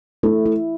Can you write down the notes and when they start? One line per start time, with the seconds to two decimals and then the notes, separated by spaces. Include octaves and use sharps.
0.23 A3 E4
0.46 E4